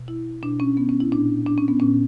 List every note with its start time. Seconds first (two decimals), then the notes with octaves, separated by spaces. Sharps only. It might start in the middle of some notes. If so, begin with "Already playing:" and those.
Already playing: B2
0.08 E4
0.43 B2 D4
0.60 C#4
0.77 B3
0.89 C#4
1.00 E4
1.12 A#2 D4
1.47 D4
1.58 C#4
1.68 B3
1.80 A#2 C#4